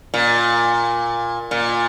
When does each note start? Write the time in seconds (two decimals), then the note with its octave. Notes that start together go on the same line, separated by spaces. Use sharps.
0.14 A#2
1.51 A#2